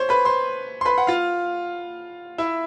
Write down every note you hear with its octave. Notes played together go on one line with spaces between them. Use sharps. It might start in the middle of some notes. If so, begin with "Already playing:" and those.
Already playing: C5 C#5 C6
B4 B5
C5 C6
C6
B4 B5
F#5
F4 F5
E4 E5